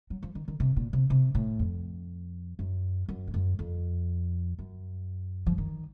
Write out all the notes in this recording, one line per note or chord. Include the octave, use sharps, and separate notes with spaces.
F#3
F3
D#3
D#3
C3
A#2
C3
C3
A2
F2
F#2
F#2
A2
F#2
F2
F#2
F3
D#3